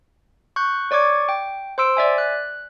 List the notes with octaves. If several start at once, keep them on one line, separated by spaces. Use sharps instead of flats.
C#6 F#6 G6
C#5 D5 C#6 D6 G#6
G5
C5 C6 E6 D7
D5 E5 G#5
F#6